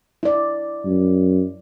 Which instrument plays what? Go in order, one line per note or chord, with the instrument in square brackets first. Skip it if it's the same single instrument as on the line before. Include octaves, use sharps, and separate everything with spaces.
[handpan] E4 D5
[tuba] F#2